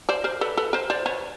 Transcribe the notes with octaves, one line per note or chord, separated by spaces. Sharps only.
C5 D5
A#4 C5
A4 B4
A4 B4
A#4 C5
C5 D5
B4 C#5